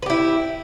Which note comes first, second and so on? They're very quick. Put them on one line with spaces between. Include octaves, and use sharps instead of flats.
B4 G4 E4